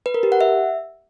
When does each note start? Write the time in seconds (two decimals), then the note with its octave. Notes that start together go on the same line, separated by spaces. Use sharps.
0.06 B4
0.14 A#4
0.23 G4
0.32 F#5
0.41 E5